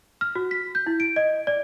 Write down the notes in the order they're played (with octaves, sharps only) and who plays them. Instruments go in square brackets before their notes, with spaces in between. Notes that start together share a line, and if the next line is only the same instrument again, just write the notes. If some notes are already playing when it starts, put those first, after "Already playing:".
[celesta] F6
F#4
B6
G6
E4
D7
D#5
D5